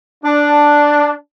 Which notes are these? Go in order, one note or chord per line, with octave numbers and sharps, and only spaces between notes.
D4